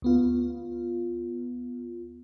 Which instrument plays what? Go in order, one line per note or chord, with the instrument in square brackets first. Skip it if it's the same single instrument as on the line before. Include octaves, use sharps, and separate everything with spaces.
[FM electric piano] D2 B3 F4